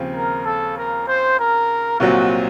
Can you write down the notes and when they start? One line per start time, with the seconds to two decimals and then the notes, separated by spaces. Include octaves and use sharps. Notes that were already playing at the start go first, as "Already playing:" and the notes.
Already playing: D#2 C#3 F3 C4
0.14 A#4
0.45 A4
0.76 A#4
1.07 C5
1.38 A#4
2.00 C2 A#2 F#3 C4 F#4